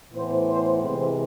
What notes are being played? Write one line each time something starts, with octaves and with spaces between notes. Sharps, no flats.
A2 E3 B3 C5
C5
C3 E3 G#3 C4 C5